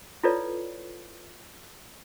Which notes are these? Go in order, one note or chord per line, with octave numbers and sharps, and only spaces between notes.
E4 F4 A4 B4 C#5 D5